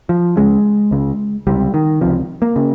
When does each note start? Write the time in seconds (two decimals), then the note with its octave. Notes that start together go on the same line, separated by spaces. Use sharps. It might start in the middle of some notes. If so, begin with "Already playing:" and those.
0.09 F3
0.37 C#2 C#3 G#3
0.91 C#2 C#3
1.47 C#2 C3 G3
1.74 D#3
2.01 C#2 C3 F3
2.42 A#3
2.56 C#3